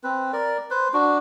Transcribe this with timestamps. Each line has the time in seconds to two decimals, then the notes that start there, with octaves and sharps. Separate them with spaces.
0.04 C4 B4
0.33 A#4 D5
0.70 B4 C5
0.94 D4 F#4